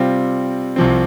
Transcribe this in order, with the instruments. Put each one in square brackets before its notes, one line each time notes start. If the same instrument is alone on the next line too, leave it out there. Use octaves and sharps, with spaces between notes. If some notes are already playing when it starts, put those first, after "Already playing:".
Already playing: [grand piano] C3 G3 C4 F4
C2 C3 F3 C4